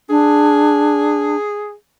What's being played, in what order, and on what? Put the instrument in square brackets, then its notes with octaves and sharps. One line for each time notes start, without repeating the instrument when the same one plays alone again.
[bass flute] D4 [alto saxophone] G#4